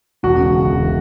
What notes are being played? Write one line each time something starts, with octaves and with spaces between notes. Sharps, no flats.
E1 F#4
C#3
C#3
E1
E3